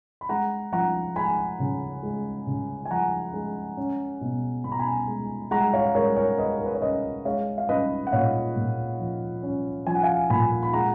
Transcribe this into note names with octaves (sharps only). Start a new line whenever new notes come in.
B5
G#3 F#5 A#5
F3 F#5 A#5
G#3 G#5 B5
C#3
G#3
C#3
G#5
F3 F#5 A#5
G#3
C#4
B2
B2 B5
A#5
G#5 B5
G#3
G#3 F#5 A#5
C#5 F5
G#3 A#4 C#5
A#4 C#5
G#3 B4 D#5
A#4
B4
C#5
C#4 B4 D#5
G#3 C#5 F5
F5
C#4 B4 D#5
F#5
A#2 C#5 F5
A#2
F3
C#4
F3 G#5
F#5
F5 G#5
A#2 G#5 B5
B5
G#3 F#5 A#5